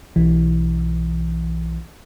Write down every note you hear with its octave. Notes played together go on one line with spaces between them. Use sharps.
B1 E3